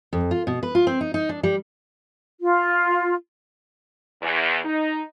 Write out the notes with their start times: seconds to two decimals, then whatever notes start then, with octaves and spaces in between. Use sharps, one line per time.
0.13 F2
0.31 F4
0.47 B2
0.63 B4
0.75 F4
0.87 C4
1.01 D#4
1.14 D#4
1.29 D4
1.43 G3
2.40 F4
4.21 E2
4.65 D#4